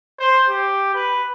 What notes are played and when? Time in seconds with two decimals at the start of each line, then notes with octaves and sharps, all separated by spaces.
0.19 C5
0.48 G4
0.94 B4